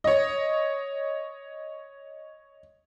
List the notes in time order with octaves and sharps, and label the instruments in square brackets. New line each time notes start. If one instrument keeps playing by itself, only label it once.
[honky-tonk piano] C#5 D#5